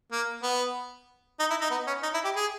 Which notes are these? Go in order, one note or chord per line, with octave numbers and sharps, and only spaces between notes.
A#3
B3
D#4
E4
D#4
B3
C#4
D#4
E4
G4
G#4